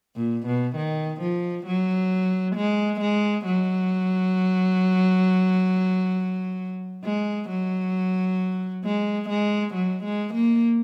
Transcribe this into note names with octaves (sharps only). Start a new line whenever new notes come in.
A#2
B2
D#3
F3
F#3
G#3
G#3
F#3
G#3
F#3
G#3
G#3
F#3
G#3
A#3